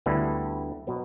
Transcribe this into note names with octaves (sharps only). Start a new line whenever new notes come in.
D2 D3 G3 B3 E4
B2 F#3 B3